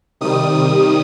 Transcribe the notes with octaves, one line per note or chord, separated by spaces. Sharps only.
C3 D#3 G3 D#6